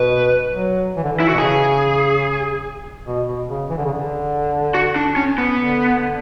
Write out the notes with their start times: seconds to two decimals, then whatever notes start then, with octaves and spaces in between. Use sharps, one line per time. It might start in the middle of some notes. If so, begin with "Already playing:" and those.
Already playing: B2 B4
0.54 F#3
0.97 E3
1.04 D3
1.12 E3
1.20 E4
1.28 F#4
1.33 B2
1.38 C#3 G#4
3.06 B2
3.28 B2
3.48 C#3
3.70 E3
3.78 D3
3.85 C#3
3.94 D3
4.74 F#4
4.96 D4
5.16 C#4
5.38 B3
5.59 D3